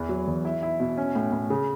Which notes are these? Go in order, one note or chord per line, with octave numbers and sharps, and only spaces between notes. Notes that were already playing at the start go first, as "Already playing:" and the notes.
Already playing: E2 E3
F#3
E2
E4
E4
B2
C#4
A2
A2
C#3